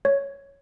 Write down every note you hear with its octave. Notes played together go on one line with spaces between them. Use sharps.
C#5